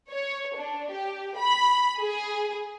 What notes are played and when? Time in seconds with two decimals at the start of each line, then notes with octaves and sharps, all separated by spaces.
0.10 C#5
0.57 D4
0.93 G4
1.38 B5
2.00 G#4